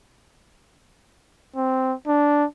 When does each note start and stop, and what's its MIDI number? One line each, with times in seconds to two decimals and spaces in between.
1.56 1.93 60
2.07 2.45 62